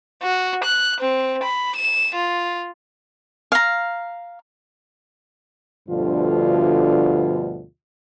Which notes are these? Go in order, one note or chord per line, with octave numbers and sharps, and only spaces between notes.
F#4
F#6
C4
B5
E7
F4
F5 A#5
D2 G2 B2 D3 F3 F4